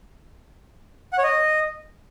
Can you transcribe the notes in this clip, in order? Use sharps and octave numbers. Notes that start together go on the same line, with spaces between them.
F#5
C#5
D#5